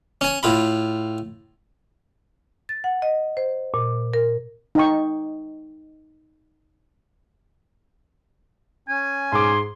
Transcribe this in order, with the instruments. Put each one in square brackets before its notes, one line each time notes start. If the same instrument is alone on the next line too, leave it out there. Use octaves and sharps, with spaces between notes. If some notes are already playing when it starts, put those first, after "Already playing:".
[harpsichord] C#4 G#5
A2 F4 B5
[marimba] A6
F#5
D#5
C5
A#2
A#4
[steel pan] D#4 D#5 G5 C#6
[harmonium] C#4 [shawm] G#5
[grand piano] G#2 G#4 D6 [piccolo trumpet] C6